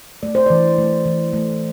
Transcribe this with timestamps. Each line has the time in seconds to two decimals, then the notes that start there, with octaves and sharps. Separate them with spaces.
0.23 A3 D5
0.35 C5
0.46 E3 D5
0.78 A3
1.05 E3
1.33 A3